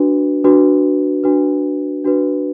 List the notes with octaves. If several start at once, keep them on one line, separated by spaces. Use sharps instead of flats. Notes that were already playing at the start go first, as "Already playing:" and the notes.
Already playing: D4 F#4 B4
D4 F#4 B4
D4 F#4 B4
D4 F#4 B4